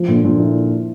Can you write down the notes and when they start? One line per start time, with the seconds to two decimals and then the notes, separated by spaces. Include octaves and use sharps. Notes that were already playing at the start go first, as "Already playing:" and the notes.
Already playing: F3
0.08 A#2 D3 A#3
0.24 A#2 D3 F3
0.39 E4